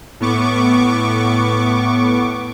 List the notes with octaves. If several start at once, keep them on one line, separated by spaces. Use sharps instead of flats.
A2 B3 C#6 D6